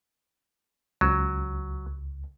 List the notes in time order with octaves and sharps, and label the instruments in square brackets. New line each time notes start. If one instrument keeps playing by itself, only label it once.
[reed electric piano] C#2 [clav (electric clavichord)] F#3